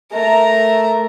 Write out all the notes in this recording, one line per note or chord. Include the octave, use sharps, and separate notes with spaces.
A3 A#4 A#5